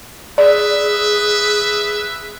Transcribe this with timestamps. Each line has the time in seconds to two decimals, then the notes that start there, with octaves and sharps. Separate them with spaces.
0.38 G#4 B4 D5 E5